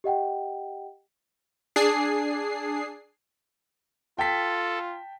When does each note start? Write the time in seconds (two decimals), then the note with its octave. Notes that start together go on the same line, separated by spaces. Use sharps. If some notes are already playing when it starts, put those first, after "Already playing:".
0.04 G4 D#5 F#5 G5
1.76 D4 G#4 C7
4.19 F4 A4 G5 A5 B6